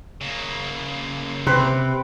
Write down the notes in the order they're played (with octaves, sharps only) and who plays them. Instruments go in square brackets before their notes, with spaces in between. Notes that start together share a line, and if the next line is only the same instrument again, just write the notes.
[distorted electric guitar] C#3 A#3
[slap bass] C3 [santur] C4 B4 G5